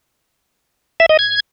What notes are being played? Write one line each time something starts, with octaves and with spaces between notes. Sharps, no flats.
E5
D#5
G#6